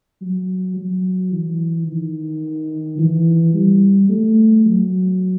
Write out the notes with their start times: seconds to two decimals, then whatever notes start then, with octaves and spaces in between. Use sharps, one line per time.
0.22 F#3
0.77 F#3
1.32 E3
1.87 D#3
2.98 E3
3.54 G3
4.09 A3
4.65 F#3